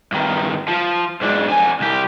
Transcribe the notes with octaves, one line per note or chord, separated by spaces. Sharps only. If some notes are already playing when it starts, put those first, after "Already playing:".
G2 D#3
F3
G#2 D4
F2 G#5
C2 G4